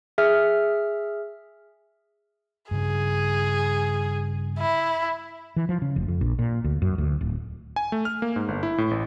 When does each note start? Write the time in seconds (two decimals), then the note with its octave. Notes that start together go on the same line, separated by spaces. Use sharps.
0.18 G#4 E5 F6
2.71 G2 C#3 G#4
4.59 E4
5.56 E3
5.69 F3
5.82 C#3
5.96 F1
6.08 F2
6.21 A#1
6.39 A#2
6.64 D2
6.82 F#2
6.98 D2
7.21 D1
7.76 G#5
7.92 A3
8.05 F6
8.22 A#3
8.36 G#2
8.48 G1
8.63 E4
8.78 A2
8.91 A1